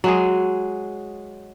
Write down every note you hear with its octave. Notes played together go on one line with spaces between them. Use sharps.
F#3 G#3 G#4